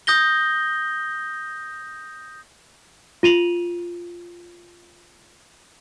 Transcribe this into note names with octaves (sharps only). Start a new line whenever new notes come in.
D#6 G6 A#6 G7
F4 D#7 F7 F#7